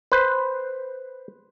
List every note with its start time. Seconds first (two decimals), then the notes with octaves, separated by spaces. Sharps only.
0.12 B4 C5